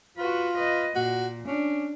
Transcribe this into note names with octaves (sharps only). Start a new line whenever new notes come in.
F4 F#4 B4
B4 D#5
A#2 F#4
C#4 D4